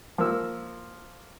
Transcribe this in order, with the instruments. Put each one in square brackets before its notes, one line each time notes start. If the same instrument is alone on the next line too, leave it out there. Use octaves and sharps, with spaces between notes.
[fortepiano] F3 A#3 E6